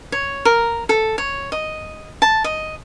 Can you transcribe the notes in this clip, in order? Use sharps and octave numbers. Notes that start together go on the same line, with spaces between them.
C#5
A#4
A4
C#5
D#5
A5
D#5